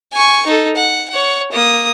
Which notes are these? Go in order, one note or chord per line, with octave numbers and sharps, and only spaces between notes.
G#5 C#6
D#4 A4
F#5
C#5 F#5
A#3 D#6